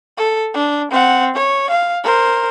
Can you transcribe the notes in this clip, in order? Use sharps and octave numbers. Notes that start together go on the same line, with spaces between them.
A4
D4
C4 F#5
C#5
F5
A#4 C5